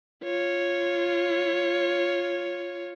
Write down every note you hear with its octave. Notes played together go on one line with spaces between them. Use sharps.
F4 C#5